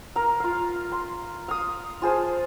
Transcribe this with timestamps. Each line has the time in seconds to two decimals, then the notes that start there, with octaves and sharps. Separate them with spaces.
0.16 A#4 F5
0.40 F4 F5
0.92 C6
1.48 F5 D#6
2.02 F4 G#4 C5 A5